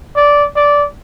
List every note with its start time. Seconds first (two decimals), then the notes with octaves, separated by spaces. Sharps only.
0.16 D5
0.56 D5